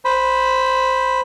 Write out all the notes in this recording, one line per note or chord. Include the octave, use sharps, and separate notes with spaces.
C5 B5